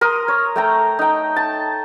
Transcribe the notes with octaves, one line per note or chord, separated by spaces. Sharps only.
A#4 C6 D#6
C#5
A3 G5 A#5
D#4 G5
A5